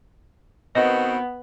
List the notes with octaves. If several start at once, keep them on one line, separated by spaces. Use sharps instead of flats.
B2 D#3 B3 C4 D#5